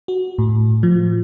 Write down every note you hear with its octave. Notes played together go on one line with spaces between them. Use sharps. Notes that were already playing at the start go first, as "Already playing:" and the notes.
F#4
A2
F3